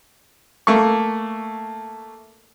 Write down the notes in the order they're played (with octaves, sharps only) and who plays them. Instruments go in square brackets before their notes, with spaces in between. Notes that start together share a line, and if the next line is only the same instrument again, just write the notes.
[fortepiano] A3 A#3 C#6